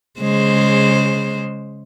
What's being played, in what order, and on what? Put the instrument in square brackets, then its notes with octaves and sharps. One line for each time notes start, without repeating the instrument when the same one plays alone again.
[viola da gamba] C#3 G#3 C5